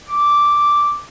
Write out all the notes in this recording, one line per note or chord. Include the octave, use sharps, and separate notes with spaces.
D6